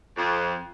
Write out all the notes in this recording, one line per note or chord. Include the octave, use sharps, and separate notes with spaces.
F2